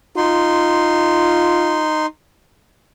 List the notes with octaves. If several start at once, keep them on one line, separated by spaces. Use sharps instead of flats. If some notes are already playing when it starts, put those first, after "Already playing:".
D#4 F4 C6